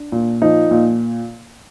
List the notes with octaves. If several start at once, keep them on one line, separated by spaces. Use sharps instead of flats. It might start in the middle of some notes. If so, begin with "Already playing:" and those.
Already playing: D4
A#2
F3 D#4
A#2